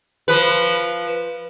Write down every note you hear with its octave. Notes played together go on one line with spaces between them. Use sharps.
F3 B4